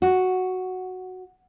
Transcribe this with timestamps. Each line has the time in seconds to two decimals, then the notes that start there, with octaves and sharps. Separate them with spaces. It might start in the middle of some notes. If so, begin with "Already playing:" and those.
0.02 F#4